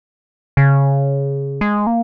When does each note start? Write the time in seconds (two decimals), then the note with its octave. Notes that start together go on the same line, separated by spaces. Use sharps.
0.57 C#3
1.61 G#3
1.87 A#3